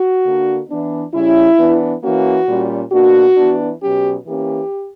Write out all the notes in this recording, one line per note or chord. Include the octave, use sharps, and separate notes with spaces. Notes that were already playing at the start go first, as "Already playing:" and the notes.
Already playing: F#4
D3 A#3 D4
E3 B3 D4
C#3 G3 C#4 E4
E3 B3 D4
E3 A#3 C#4 F#4
A#2 G3 C#4
B2 A#3 D4 F#4
E3 B3 D4
B2 F#3 C#4 G4
E3 A#3 C#4 G4